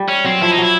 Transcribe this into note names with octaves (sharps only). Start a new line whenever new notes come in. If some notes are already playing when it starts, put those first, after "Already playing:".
Already playing: G3
C#4
F#3 C4
F3 E4
D#4
F#3 E4